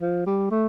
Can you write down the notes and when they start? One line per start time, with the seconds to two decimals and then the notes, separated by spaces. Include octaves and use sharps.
0.01 F3
0.26 G3
0.51 A3